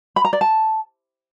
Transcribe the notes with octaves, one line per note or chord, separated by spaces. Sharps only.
B5
A#5
D5
A5